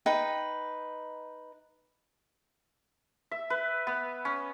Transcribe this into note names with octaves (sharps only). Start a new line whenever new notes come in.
D#4 B4 G5
E5
B4
B3
C#4